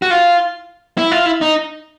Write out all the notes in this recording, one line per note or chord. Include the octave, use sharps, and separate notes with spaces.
F#4
F4
E4
F4
E4
D#4